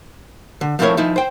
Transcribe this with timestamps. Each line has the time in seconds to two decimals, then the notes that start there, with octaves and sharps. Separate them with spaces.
0.61 D3
0.79 F3 A3 C4 E4 A#4 C#5
0.97 F3 D#4 E4
1.16 C5 G5